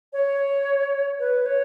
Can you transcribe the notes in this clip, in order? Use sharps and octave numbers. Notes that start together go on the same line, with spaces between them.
C#5
B4
C#5